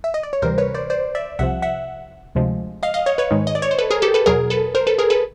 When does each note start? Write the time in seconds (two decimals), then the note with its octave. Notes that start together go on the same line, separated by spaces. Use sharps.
0.04 E5
0.14 D#5
0.23 D5
0.33 C#5
0.42 D2 C3 E3 G3 A#4 C5
0.58 B4 C#5
0.74 C5 D5
0.90 C5 D5
1.15 D5 E5
1.39 C2 C3 F3 E5 F#5
1.62 E5 F#5
2.35 D2 C3 F3 G#3
2.83 D#5 F5
2.94 D#5 F5
3.06 C#5 D#5
3.18 B4 C#5
3.31 G#2 D#3 G#3
3.47 D#5
3.55 D5
3.62 C#5
3.71 C5
3.79 A4 B4
3.91 G#4 A#4
4.02 G4 A4
4.14 A4 B4
4.26 E2 B2 F#3 G#4 A#4
4.50 A4 B4
4.75 A#4 C5
4.87 A4 B4
4.98 G#4 A#4
5.10 A4 B4